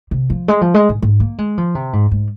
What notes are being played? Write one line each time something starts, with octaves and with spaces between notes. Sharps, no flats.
C3
F3
G#3
F3
G#3
G#2
G#2
A#3
G#3
F3
C3
G#2
G#2